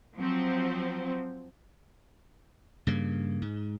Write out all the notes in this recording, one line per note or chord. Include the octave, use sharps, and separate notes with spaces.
F3 F#3 C4
G2 C#3 A#3
G#2